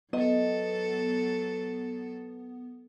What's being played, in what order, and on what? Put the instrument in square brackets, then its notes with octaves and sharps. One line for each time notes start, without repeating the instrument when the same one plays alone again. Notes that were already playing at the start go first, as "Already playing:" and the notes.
[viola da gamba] F#3 A4 [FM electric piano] B3 [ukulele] D#5